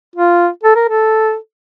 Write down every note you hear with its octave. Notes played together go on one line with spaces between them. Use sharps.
F4
A4
A#4
A4